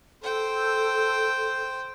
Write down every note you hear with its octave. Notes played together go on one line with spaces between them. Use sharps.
A4 C5 G5